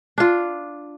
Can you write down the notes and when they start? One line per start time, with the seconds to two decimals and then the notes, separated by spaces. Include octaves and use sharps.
0.18 D4 F4